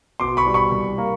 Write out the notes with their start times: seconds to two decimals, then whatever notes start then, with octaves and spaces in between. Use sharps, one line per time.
0.20 B2 C6 D6
0.37 B5 C#6
0.47 G3
0.54 B5 C#6
0.72 C2
0.98 A#3